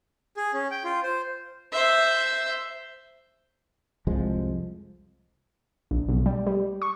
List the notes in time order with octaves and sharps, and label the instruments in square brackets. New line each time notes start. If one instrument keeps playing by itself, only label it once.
[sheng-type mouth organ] G#4
C#4
G5
F4
C5
[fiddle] C5 E5
[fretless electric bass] C2 F2 F3 G#3
[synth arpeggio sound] A#1
B1
G3
G3
C#6